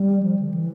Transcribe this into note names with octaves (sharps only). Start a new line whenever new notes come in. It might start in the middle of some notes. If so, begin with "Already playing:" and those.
Already playing: G3
F3
D3
E3